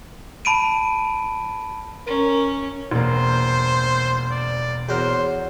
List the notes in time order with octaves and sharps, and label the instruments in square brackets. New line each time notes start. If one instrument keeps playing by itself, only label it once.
[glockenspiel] A5 B5 D7 D#7
[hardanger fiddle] C#4 [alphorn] A#4
[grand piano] E1 A#3 [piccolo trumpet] C5
[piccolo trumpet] D5
[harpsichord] E2 F#3 A#4 [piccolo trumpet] C5